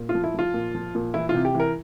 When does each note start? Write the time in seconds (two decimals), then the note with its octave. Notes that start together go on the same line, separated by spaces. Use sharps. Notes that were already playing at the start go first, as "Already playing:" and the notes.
Already playing: A#2
0.09 F4
0.15 F3
0.24 E4
0.34 F3 F4
0.54 A#2
0.75 F3
0.95 A#2
1.14 E3 E4
1.29 F4
1.34 C3
1.45 G4
1.55 E3 A#4